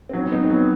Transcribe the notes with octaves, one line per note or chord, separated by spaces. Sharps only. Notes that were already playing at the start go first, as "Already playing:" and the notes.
C4
F#3 D#4
B3
C4 D#4
F#3 B3